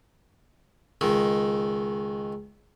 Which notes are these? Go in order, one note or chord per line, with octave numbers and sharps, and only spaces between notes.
C#2 D#3